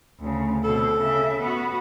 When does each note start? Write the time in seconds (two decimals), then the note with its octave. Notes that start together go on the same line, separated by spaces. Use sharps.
0.20 D2 C#3
0.64 B2 C4 A4
0.98 C#3 E5
1.40 B3 F#4